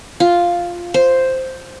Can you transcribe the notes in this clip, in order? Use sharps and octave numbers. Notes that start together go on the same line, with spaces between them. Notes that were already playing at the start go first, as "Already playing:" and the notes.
F4
C5